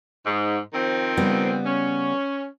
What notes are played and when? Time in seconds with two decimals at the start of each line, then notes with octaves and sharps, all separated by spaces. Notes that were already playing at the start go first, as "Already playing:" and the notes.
0.26 G#2
0.73 D#3 F3 C4
1.17 C#3 G3 B3
1.66 C#4